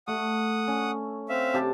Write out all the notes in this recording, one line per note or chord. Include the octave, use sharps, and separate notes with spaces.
A3 F#5 D#6
C#4
C4 E5 F5
C3 G4 A5